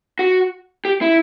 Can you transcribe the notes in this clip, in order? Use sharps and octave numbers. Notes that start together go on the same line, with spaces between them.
F#4
G4
E4